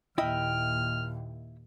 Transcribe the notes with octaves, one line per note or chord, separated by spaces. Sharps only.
D#2 A#2 E4 D#5 E5 G5 F6